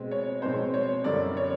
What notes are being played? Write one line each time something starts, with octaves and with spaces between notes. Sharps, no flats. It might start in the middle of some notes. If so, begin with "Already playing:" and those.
Already playing: B2 G#3 C4
C#5
B2 G#3 C4 C5
C#5
F#2 D3 G3 D5
C#5